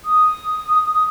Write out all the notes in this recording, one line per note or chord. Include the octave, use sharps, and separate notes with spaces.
D#6